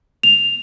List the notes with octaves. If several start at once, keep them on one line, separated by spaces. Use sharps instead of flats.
F7